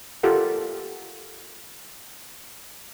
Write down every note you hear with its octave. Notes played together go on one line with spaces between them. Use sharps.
F4 G4 A4 A#4 F#5